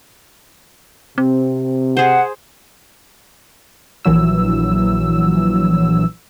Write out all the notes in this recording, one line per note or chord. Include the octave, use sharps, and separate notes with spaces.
C3 C4
G#4 C5 F#5
A#1 E3 F#3 E6